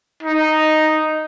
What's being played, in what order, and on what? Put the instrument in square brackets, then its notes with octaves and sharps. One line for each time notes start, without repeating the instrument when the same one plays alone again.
[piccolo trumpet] D#4